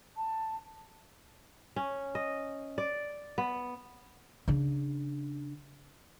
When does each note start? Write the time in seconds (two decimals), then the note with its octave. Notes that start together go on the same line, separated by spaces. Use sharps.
0.17 A5
1.76 C#4
2.15 D#5
2.78 D5
3.38 B3
4.48 C#3 D4